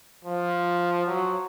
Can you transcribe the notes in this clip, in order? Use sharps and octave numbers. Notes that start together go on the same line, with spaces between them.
F3
F#3